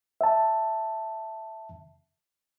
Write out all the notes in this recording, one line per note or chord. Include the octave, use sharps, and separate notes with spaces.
E5 A5